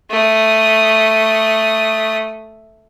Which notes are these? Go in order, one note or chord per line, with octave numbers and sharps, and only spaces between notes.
A3 D#6